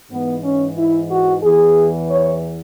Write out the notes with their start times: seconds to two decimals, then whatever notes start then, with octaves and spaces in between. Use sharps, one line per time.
0.10 G#2 E3 B3
0.43 C#4
0.76 E4
1.09 F#4
1.42 E2 E3 G#4
2.08 C#5